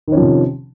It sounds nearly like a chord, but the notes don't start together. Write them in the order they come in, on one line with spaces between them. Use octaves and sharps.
D#3 C#4 F3 C3